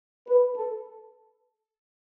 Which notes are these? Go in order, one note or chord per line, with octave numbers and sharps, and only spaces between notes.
B4
A4